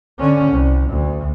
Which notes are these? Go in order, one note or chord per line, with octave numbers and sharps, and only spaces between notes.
D3 C#4
C2
D2